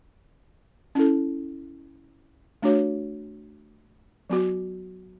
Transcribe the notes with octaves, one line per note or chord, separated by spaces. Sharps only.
C#4 E4 A4
A3 D4 F#4 C#5
F#3 B3 F#4